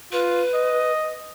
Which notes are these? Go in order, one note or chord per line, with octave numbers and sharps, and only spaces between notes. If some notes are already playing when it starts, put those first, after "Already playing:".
F4 B4
D#5